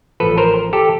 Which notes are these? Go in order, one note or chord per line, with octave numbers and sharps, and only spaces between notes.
A1 A2 F3 A4 B4
A#4 C5
G4 A4